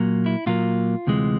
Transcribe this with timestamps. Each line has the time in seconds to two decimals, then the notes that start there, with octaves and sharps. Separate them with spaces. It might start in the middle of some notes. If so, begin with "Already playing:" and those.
Already playing: A#2 F#3 A#3
0.26 E4
0.46 A#2 F#3 A#3 F4
1.07 D2 C3 E3 G#3